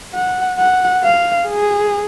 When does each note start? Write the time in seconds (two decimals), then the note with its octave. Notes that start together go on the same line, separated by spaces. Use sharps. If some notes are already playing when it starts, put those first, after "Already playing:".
0.14 F#5
0.58 F#5
1.04 F5
1.49 G#4